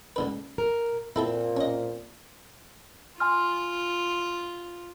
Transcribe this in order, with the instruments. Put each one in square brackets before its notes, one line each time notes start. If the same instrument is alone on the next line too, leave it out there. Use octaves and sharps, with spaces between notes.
[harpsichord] C#2 D3 B4
[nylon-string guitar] A#4
[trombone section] A#2 [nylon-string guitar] C4 [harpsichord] E4 A4 E5
[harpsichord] C#4 D#5
[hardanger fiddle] F4 [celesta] G#5 C6 F6